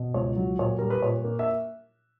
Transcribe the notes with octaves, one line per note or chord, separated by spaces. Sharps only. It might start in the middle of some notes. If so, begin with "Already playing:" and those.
Already playing: B2
C#2 C#5
F#3
A#2 C#5
G3 A#4
B4
A#2 C#5
A#3
E5